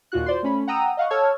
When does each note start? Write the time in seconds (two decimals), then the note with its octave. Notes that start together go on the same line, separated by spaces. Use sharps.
0.12 D#2 A#2 F4 F#4 F#6
0.26 C5 D5 C6
0.43 A3 C#4 B5
0.67 F#5 G5 A#5 D#6 E6 D#7
0.97 D#5 F5 F#5 C#6
1.10 A4 C#5 A5 E6 F6 G#6